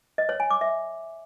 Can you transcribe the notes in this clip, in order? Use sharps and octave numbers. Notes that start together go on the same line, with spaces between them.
D#5
C#5
G#5
D6
E5